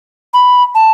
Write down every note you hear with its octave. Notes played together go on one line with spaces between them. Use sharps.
B5
A5